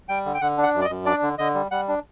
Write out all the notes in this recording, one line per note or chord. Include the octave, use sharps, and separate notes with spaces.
G3 G5
D3
G5
D3 F#5
D4
F#5
F#2
D5
D#5
F#2
D4 D5
D3
D3 D#5
G3
G3 F#5
D4